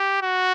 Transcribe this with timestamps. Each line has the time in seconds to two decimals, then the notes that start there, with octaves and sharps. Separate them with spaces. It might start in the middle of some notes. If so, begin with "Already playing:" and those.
Already playing: G4
0.22 F#4